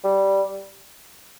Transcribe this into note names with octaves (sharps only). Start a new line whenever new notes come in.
G3